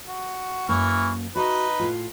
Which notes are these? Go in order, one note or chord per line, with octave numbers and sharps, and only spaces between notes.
F#4
F#2 E3 A#3 C#6 F6
D#4 F#4 B4 E5
A2 F4